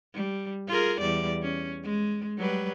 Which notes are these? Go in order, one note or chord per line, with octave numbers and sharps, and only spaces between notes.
G3
F4 G#4 A#4
E2 G3 D5
C#4
G#3
F#3 G3 B4